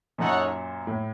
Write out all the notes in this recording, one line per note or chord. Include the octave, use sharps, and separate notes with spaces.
F#2 A#2 D#4 A4 C#5 F#5
A2